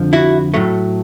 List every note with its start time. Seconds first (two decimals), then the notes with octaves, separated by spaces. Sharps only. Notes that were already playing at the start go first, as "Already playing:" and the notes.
Already playing: F2 D3 F3
0.13 E4 F#4
0.54 A2 F#3 A3